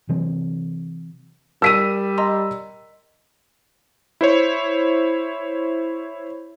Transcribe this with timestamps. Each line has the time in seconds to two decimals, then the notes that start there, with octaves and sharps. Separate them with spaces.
0.09 C3 E3 F#3 C4
1.62 G3 A#4 E6 B6 D7 D#7 F7
2.18 D#5 A#5 C6
4.21 E4 C5 C#5